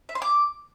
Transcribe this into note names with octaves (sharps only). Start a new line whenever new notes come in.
E5
C6
D6